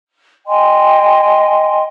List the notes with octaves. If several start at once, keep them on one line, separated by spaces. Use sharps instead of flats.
D#5 G5 G#5 C6